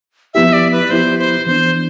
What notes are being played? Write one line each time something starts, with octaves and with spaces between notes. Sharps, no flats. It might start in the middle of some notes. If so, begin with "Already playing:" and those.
F3 B3 E4 G4 E5
D5
B4
F3 B3 E4 G4 C5
C5
E3 B3 D4 C5